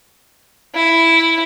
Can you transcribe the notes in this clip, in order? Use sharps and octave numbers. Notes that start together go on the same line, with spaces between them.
E4